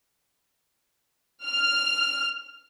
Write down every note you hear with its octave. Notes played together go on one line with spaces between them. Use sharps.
F6